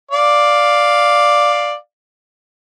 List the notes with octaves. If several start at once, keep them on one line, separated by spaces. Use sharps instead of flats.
D5 F5